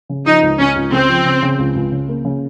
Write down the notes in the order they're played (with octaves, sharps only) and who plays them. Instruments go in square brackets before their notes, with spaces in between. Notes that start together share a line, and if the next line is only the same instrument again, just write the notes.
[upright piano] C#3
[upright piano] F3 [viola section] D#4
[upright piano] C#2
[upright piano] C#2 [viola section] C#4
[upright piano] C#2
[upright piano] C#3 [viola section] C4
[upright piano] F3
C#3
C#3
C#2
C#2
C#3
A#3
C#3